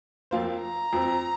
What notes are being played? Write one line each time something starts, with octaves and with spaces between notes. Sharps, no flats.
F2 F3 A#3 F4 C5
A#5
F2 F3 C4